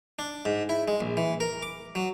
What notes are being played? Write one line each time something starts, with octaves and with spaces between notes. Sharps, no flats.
D4
G#2
E4
G#3
A#1
E3
A#4
D6
F#3